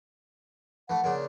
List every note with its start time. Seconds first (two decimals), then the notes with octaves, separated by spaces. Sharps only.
0.90 E3 A3 F#5
1.04 A#2 C#3 D4